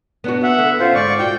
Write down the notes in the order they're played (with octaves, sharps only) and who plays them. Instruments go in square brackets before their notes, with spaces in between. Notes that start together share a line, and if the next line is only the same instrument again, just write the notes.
[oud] B3 D4 F#4
[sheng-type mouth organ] E5 F#5
[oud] D3 B3
[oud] C#4 [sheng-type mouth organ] F4 C5
[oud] G#2 [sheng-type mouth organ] D5 C#6
[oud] F4 F#4 [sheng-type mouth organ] G5